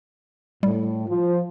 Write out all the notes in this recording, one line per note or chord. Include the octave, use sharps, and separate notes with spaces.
A2 G3
F3